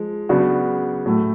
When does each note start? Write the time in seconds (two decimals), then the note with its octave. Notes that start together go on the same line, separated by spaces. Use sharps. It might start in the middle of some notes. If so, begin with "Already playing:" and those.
Already playing: F3 G#3
0.29 C#3 F#3 B3 D4 F#4
1.06 A2 F#3 A3